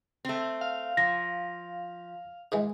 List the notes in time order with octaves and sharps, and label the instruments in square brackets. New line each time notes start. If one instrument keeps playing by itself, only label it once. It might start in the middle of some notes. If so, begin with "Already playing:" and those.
[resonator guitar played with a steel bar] A3 C4
[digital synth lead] F5
[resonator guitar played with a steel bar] F3 [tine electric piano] A#6
[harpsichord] G#2 E3 G#3